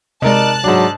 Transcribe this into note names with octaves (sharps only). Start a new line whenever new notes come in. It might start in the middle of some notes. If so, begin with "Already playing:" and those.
C3 G#3 D#4 A#4 D5 A5 F#6
G#2 F#3 D4